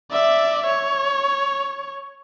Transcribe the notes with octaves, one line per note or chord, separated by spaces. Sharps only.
D5 E5
C#5